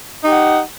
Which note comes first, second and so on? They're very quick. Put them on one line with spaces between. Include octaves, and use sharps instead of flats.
D#4 G4 F#5